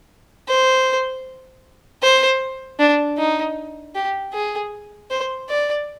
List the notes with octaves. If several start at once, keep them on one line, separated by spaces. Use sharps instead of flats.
C5
C5
D4
D#4
G4
G#4
C5
D5